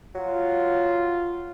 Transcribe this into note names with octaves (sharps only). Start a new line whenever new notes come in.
F#3 F4